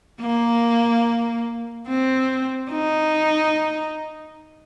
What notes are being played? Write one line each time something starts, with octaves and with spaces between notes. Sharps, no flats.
A#3
C4
D#4